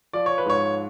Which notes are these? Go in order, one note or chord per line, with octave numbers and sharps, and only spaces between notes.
F3 D5
C#5
B4
G#2 C#5